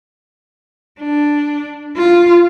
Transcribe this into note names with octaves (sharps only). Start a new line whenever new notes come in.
D4
F4